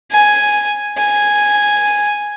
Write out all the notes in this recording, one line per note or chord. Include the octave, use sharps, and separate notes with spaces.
G#5
G#5